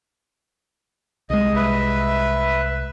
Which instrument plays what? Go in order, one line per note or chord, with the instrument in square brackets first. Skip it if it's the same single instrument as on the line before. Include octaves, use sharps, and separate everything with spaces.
[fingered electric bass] C2 G#3 [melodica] D#5
[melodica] B4 E5